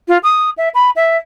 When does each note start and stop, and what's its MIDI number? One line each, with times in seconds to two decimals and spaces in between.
0.08 0.18 65
0.23 0.50 87
0.58 0.69 76
0.75 0.91 83
0.96 1.18 76